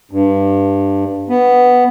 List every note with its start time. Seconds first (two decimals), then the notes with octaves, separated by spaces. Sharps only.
0.11 G2
1.29 B3